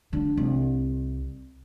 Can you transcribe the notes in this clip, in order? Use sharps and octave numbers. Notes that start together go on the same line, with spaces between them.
D3
C2